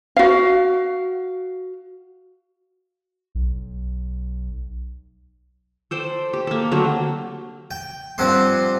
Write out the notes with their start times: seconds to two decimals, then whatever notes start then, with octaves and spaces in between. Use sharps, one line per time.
0.16 F#4 F5
3.35 B1
5.91 A4 C5 D5 G5
6.33 G4
6.47 A#3 A4
6.71 D3 F#3 A3 C4
7.71 G5
8.18 G2 F3 C4 F#5 C6